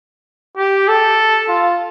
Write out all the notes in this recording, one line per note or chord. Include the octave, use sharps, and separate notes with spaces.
G4
A4
F4